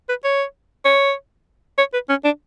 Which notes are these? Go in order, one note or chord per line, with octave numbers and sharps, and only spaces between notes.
B4
C#5
C#5
C#5
B4
C#4
D4